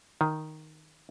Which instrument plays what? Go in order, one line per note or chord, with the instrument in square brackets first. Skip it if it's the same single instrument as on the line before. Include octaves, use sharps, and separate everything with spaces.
[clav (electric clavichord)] D#3